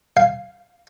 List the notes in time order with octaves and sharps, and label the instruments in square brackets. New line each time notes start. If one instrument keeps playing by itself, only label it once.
[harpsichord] F5